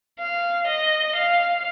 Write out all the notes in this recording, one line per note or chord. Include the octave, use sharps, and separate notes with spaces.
F5
D#5
F5